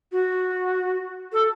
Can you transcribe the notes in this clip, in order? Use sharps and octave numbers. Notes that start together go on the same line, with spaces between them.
F#4
A4